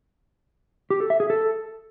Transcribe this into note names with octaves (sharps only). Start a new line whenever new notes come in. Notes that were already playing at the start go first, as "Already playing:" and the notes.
G4
A4
E5
G#4
A4